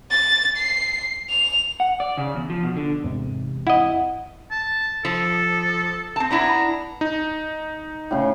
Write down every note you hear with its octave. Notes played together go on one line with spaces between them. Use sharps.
A6
C7
F7
F#5
D5
C#3
E2
F3
B2
D3
E2 G#2 C3
E4 D#5 F#5
A5
F3 A4
C4 A5
B3 D4 E4 A#5
D#4
A2 C#3